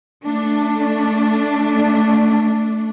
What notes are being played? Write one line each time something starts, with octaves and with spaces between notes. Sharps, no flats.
A3 D4